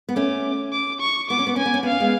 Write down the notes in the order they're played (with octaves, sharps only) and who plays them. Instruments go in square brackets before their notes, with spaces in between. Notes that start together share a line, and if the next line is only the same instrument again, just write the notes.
[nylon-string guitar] B3
[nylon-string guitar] A3 C#4 [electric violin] D6
[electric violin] D6
C#6
[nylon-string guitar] B3 [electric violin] D6
[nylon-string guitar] C#4
B3
[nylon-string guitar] C#4 [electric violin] G#5
[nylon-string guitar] B3
C#4
B3
[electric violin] F5
[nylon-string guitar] C#4
G#3 B3